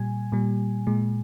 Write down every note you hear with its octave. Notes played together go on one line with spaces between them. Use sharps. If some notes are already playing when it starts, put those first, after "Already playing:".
Already playing: A#2 G3 G#5
A#2 G3
A#2 G#3